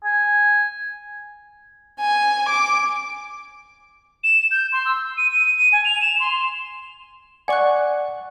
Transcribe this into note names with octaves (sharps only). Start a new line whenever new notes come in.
G#5
G#5
D6
E7
G6
C6
E6
D#7
D#7
D#7
G#5
F7
E7
C6
D5 F#5 G#5 C#6 F#6